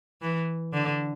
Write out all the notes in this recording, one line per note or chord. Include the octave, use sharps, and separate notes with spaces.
E3
D3